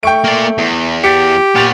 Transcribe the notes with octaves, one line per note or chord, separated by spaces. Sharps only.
A3 G5 C#6 D7
A#3 D5
E2
G4 A6 B6 C#7
A#2 B3 C#5 A6 F7